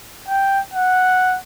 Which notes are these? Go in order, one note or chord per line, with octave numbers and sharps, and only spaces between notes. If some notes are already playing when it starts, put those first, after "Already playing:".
G5
F#5